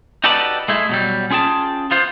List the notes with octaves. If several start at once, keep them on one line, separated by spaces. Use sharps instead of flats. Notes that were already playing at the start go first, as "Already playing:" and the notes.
D#4 F#4 G4 A4 B4 D5
G#3 A3 E4
B2 F#3 G3
C#4 F4 G#4 G5 A5
B3 F4 C5